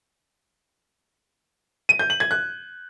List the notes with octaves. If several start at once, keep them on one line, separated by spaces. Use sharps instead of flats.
D#7
G6
F#7
G#6
F#6